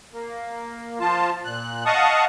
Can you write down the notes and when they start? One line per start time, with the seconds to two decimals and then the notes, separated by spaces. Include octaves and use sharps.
0.12 A#3
1.00 F3 F4 A5
1.44 A#2 F#6
1.86 D#5 F5 F#5 A5 C#6 D#6